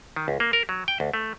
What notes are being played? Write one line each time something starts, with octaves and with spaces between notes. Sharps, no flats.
D#3
C#2
A#3
A#4
F#3
G5
D2
A3